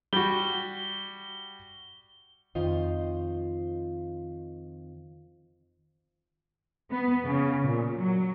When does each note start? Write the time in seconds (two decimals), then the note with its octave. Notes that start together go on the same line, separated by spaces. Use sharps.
0.13 G3 F#4 G7
2.55 F2 D#3 F4 C5 D#5
6.91 B3
7.25 C#3
7.66 A#2
7.98 F#3